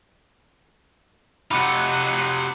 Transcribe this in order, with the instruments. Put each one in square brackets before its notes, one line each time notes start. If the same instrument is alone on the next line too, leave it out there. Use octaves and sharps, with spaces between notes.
[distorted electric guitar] C3 F4 [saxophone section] F#3 D#4 [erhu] F#5 [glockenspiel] B5 D6 C#7